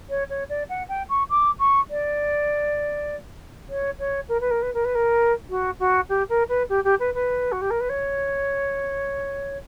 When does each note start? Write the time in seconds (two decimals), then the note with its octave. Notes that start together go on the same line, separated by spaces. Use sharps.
0.09 C#5
0.30 C#5
0.49 D5
0.69 F#5
0.89 G5
1.09 C#6
1.29 D6
1.59 C#6
1.90 D5
3.69 C#5
3.99 C#5
4.29 A#4
4.41 B4
4.50 A#4
4.62 B4
4.74 A#4
4.84 B4
4.95 A#4
5.49 F#4
5.79 F#4
6.09 G4
6.29 A#4
6.49 B4
6.69 G4
6.84 G4
6.99 B4
7.14 B4
7.52 F#4
7.61 G4
7.70 A#4
7.80 B4
7.89 C#5